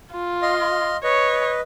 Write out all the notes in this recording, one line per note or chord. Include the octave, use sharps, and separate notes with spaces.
F4
D#5 F5 C6
B4 C#5 D#5